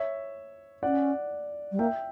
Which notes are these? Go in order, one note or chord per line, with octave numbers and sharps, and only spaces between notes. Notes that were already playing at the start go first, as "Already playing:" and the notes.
Already playing: C#5 E5
C#4 D5 F#5
G3
A#3 E5 G5